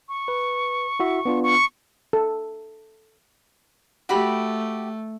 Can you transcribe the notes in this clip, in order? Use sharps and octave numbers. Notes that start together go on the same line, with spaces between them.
C#6
B4
E4 F#4 E5
B3 D4 F4
C#6
A4
A3 F#4 G4 B5